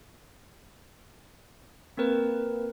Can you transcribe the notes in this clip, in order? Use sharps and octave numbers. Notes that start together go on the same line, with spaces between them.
A#3 C4 A#4 B4